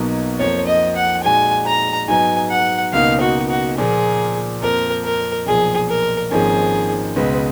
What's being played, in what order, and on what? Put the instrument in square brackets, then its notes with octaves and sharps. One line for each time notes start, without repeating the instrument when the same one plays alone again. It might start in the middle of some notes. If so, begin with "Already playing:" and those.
Already playing: [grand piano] B1 B2 F#3 A#3 D#4
[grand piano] F2 F3 A#3 [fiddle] C#5
[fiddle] D#5
F#5
[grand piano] A#2 G#3 D#4 F#4 [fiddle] G#5
[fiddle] A#5
[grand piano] G#2 F#3 B3 D#4 [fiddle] G#5
[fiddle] F#5
[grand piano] C#2 B2 A#3 D#4 [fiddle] F5
[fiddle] F#4
F#4
[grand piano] A#2 F3 A#3 [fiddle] G#4
[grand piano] F2 F3 A#3 [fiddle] A#4
[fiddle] A#4
[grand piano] B1 A#2 F3 [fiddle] G#4
[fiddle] A#4
[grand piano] G#1 G#2 F3 A#3 C#4 [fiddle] G#4
[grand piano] C#2 B2 G#3 [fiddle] B4